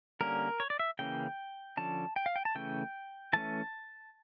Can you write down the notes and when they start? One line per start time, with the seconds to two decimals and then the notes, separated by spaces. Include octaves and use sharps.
0.21 D3 G3 A#3 C#4 A#4
0.60 C#5
0.70 D5
0.79 E5
0.99 C#3 E3 A#3 C#4 G5
1.77 D3 F3 C#4 A5
2.16 G5
2.26 F5
2.36 G5
2.45 A5
2.55 C#3 E3 A3 C#4 G5
3.33 E3 A3 C#4 A5